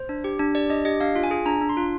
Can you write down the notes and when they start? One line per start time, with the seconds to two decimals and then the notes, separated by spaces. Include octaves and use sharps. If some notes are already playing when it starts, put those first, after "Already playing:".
Already playing: C5
0.09 D4
0.24 G4
0.39 D4
0.55 G4 D5
0.70 D4 D#5
0.85 G4 D#5
1.00 D4 F5
1.16 F4
1.23 G#5
1.31 G#4
1.46 D4 A#5
1.61 D4
1.69 C6
1.77 F4